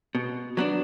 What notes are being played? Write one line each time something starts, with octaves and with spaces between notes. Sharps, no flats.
B2
F#3 B3 D4